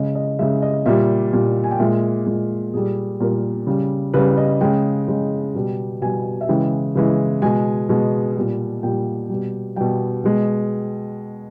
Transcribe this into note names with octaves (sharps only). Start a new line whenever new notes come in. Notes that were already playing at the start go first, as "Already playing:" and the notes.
Already playing: C#3 G#3 D#5
D#5
C#3 G#3 E5
D#5
A#2 G3 E5
A#2 G3
G#5
G5
A#2 G#3 E5
A#2 G#3
A#2 G3 G#4
A#2 G3 A#4
C#3 G3
C#3 G3 B4
D#5
C#3 G#3 G5
C#3 G#3
B2 G3
B2 G3 G#5
E5
C#3 E3 G#3 G5
C#3 E3 G#3
B2 G#3 G#5
B2 G#3
A#2 G3
A#2 G3 G5
B2 G3
B2 G3 G5
B2 G#3